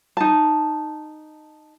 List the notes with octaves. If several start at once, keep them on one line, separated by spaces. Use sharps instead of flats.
D#4 A5